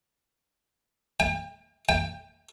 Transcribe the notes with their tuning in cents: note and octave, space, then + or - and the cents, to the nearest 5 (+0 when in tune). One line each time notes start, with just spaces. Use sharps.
G5 +35
G5 +20